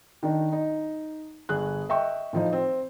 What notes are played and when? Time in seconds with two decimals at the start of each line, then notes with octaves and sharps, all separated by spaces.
0.23 D#3 D4 D#4
0.52 D#4
1.49 G1 G#4 F#6
1.89 D#5 E5 G5 C#6
2.33 A2 F3 D#4
2.53 C4